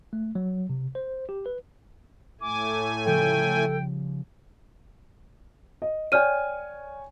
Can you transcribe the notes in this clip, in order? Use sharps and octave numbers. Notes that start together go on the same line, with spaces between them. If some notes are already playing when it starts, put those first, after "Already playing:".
A3
F#3
C3
C5
G4
B4
A2 A3 G#5 D6
C#3 F3 G3 A4 G5
D#5
C#5 D5 G5 G#5 F6 D#7